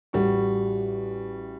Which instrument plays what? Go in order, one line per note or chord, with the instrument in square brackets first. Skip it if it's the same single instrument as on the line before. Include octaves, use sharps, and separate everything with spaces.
[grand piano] A1 G3 F#4 C#6